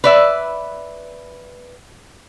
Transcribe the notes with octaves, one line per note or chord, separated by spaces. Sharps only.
B4 D5 E5